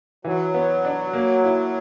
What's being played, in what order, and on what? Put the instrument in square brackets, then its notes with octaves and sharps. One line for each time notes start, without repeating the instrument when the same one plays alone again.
[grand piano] E3 [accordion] F#3
[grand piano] B3
D4
A#3
E4